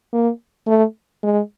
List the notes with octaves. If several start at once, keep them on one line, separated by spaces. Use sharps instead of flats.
A#3
A3
G#3